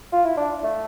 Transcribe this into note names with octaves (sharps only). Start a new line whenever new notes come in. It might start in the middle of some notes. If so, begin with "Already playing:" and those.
F4
E4
D4
A3